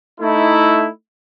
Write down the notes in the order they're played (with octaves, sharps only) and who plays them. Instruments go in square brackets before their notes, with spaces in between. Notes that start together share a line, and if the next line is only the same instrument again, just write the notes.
[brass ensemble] A3 D#4 E4